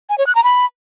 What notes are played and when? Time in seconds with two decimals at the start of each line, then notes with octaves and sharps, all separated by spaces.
0.10 G#5
0.18 C#5
0.27 F#6
0.35 A#5
0.44 B5